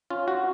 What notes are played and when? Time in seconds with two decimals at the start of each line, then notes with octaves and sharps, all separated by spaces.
0.10 C#4 F4
0.28 F#4